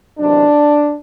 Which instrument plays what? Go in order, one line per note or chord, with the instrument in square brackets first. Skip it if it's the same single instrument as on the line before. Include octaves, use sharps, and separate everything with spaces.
[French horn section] E2 C3 D#3 F#3 D4